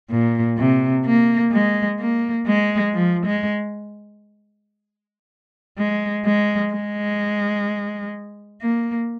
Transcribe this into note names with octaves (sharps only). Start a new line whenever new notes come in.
A#2
C3
A#3
G#3
A#3
G#3
F3
G#3
G#3
G#3
G#3
A#3